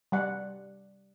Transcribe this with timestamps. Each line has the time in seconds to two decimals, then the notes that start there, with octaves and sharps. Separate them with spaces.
0.12 G3 D5 F#5